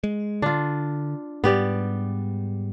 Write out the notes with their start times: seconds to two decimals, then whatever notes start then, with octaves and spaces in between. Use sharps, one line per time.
0.04 G#3
0.42 D3 D4 F4
1.44 G#2 G3 B3 G4 D5